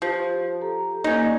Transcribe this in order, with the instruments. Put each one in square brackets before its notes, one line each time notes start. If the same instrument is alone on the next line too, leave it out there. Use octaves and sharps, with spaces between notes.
[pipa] F3 [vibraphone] G4
[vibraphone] G4 A4 A#5
[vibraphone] A#3 [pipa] C#4 D#4
[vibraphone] D5